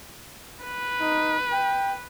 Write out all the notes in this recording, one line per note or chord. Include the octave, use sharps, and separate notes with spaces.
B4
D#4
G5